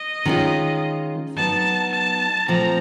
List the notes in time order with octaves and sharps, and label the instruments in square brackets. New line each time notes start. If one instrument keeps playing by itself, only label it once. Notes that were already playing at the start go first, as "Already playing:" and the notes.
Already playing: [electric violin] D#5
[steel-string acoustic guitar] D#3 G#3 C#4 F4
[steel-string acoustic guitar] F#3 B3 D#4 [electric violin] A5
[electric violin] A5
[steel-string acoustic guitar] A#2 F3 A3 C4 [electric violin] A#5